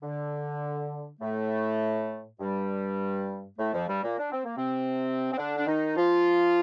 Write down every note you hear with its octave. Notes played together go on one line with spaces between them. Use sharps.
D3
A2 A3
G2 G3
A2 A3
F2 F3
G2 G3
A#2 A#3
D4
C4
A#3
C3 C4
C4
D3 D4
D4
D#3 D#4
F3 F4